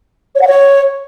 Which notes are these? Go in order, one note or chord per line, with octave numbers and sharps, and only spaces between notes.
C#5
F#5
C#5